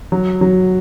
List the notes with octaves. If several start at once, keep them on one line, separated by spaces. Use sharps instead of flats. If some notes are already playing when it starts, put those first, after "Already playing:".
F#3
F#3